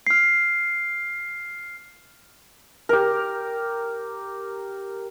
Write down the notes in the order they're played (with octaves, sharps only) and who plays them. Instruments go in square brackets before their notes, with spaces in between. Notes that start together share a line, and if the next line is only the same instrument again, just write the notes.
[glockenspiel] F6 C7
[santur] G4 A#4